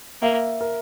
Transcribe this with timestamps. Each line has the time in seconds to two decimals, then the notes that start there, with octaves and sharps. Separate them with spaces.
0.22 A#3 E5
0.61 A#4